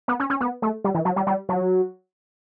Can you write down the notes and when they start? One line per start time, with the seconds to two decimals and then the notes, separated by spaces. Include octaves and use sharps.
0.08 B3
0.20 C#4
0.30 C#4
0.40 B3
0.62 A3
0.84 G3
0.94 E3
1.05 F#3
1.16 G3
1.27 G3
1.49 F#3